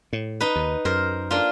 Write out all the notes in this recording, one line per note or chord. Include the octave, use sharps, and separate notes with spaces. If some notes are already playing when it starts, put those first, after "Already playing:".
A2
D#4 B4
D#2
F#2 A#4 C5
A#3 D4 F4